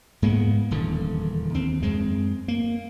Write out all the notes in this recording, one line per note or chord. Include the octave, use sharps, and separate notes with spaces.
G#2 G#3 A#3 B3
D#1 E2 D3
D#2 C4
F#2 G#3 C4
A#3